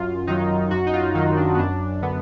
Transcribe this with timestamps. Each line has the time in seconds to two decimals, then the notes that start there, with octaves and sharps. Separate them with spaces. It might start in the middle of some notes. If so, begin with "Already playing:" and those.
Already playing: F#2 F4
0.27 D#3 F#3 D#4
0.71 F#2 F#4
0.87 D#4
0.93 F4
1.15 D#3 F#3 D#4
1.37 D4
1.54 B3
1.59 F#2 D4
2.02 D3 B3